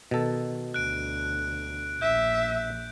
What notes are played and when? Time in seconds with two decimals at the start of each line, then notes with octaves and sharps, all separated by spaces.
0.11 B2 D#3 A4
0.74 D2 F#6 D7
2.01 A#1 E5 G6